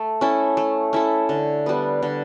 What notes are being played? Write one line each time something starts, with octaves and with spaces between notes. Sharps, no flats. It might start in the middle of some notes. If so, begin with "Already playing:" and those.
Already playing: A3
C#4 E4 A4
A3
C#4 E4 A4
D3
G3 B3
D3